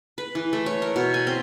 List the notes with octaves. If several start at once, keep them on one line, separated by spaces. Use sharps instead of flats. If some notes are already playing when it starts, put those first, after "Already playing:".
B4
E3
A3
C#5
A#4
B2
G#5
C4